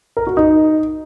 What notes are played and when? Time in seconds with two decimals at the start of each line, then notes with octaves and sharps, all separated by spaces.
0.17 A#4
0.27 F#4
0.37 D#4